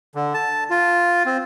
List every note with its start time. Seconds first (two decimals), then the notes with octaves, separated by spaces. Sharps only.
0.15 D3
0.34 A5
0.70 F4
1.26 C4